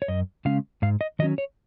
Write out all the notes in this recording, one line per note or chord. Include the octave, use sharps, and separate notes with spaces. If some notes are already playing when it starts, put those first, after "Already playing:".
C#5
F#2 D#5
C#3 G#3 C#4 F5
G#2 F5
D#5
D#3 F#3 C#4 D#5
C#5